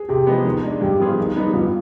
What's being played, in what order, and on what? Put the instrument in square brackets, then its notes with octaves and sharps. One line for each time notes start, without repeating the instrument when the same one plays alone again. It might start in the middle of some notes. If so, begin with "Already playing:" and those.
Already playing: [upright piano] G#4
[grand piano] C3 [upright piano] G4
[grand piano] F3 G#3 B3
D#3
G#3 D4
[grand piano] G2 [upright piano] G4
[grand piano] F3 B3 F4 G#4
D#3
G3 B3 D#4
[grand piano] G2 [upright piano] F4